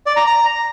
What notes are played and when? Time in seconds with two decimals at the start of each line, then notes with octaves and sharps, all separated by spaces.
0.06 D5
0.16 A#5
0.27 A#5